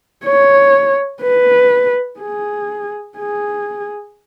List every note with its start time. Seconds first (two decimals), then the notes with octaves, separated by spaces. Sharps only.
0.25 C#5
1.22 B4
2.20 G#4
3.17 G#4